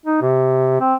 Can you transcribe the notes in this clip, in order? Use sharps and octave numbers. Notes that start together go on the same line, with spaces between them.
D#4
C3
C4